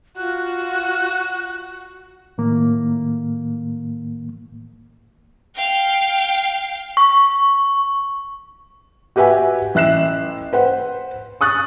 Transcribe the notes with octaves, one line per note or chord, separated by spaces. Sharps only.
F4 F#4 F#6
A2 D#3 A#3
F5 G5
C#6
F#4 G4 B4 E5 F#5 G#5
A1 E5 F#6 C7 E7
B4 C5 F#5
C#6 D#6 F#6 A6